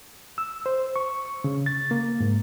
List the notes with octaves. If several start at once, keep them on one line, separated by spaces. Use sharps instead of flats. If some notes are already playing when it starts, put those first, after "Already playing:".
E6
C5
C#6
C#3
A6
A#3
G#2